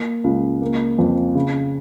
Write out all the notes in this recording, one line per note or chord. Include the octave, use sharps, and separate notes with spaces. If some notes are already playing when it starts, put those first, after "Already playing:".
Already playing: A#3
C#2
A#3
F2
C#3